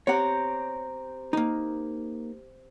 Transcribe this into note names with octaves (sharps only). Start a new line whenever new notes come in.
C4 G4 C#5 F#5 A#5
A#3 D#4